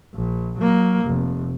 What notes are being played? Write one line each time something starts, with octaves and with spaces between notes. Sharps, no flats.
A#1
F#3 A#3
F1